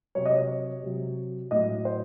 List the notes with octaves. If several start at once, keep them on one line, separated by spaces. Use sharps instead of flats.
C3 F#3 C#5
D#5
C#5
C3 F#3
A2 F#3 D#5
C5